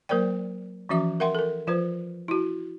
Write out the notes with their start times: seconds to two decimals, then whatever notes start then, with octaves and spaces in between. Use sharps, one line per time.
0.09 F#3 A#3 A#4 C5 D5 G5
0.89 E3 F3 C#4 F#4 E5 D6
1.20 A#4 E5 F#5 G5 C6
1.35 A4 A#4
1.67 F3 F4 B4 C5
2.28 E4 F#4